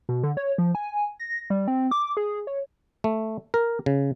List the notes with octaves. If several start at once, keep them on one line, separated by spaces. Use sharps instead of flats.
B2
D3
C#5
F3
G#5
A#6
G3
C4
D6
G#4
C#5
A3
A#4
C#3